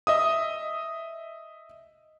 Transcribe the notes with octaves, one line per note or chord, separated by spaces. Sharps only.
D#5 E5 D#6